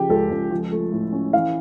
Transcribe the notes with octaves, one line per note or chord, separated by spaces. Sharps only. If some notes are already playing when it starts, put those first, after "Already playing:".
Already playing: C#3 F3 G4
C#2 A4
C#2
F3
A3
A2
C#4
E3 F5